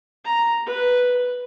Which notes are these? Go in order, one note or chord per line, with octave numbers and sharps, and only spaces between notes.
A#5
B4